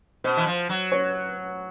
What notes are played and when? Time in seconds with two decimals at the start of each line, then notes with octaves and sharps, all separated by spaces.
0.24 B2 C5
0.37 E3
0.46 F3
0.69 F#3
0.92 C#5